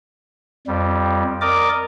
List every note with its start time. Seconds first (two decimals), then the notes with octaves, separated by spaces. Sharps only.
0.67 F2 G3
1.41 A#4 D5 D#5 D6